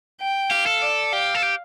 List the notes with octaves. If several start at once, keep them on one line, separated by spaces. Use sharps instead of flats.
G5
G4 F5
A4
D5
G4 F5
A4
G4